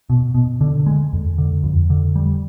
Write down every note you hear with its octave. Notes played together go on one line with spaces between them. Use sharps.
B2
B2
D3
G#3
F2
D3
F2
D3
G3